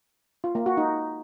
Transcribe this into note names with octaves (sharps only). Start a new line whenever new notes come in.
F4
A#3
F#4
D#4